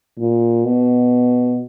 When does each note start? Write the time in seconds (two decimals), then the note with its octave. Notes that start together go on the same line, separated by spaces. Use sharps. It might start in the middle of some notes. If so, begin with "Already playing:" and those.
0.18 A#2
0.64 B2